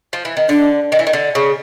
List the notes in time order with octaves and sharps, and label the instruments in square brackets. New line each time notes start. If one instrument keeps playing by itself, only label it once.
[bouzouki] F3
E3
D#3
[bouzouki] D3 [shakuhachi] D4
[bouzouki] D#3
E3
D#3
D3
C#3